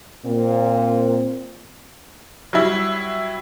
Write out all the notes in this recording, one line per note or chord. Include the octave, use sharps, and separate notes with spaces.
A#2 C4
F#3 G3 E4